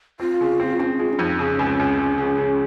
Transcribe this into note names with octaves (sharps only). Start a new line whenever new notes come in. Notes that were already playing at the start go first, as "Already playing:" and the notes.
C4 F4
C#3
C4
C4 C#4
G#3 F4
C#4
F2 D#4
C#3 C#4
C#2
C#2
C#3
C#3
C#3